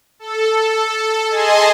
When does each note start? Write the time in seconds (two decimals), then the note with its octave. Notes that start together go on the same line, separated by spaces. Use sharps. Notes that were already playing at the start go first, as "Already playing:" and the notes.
0.19 A4
1.30 G#4 D#5 G#5 A5 C6